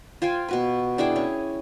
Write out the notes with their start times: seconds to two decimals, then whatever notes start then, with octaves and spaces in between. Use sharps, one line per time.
0.22 F4 C5 G5 G#5
0.49 B2 F#4 B4
0.98 D4 E4 G#4 G5
1.16 C#4